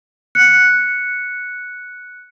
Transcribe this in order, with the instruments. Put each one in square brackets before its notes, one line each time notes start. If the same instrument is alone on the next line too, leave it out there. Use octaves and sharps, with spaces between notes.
[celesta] F#6 C#7